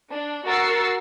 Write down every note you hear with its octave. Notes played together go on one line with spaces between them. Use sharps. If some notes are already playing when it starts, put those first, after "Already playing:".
D4
F#4 A#4 E6 A6 C7 C#7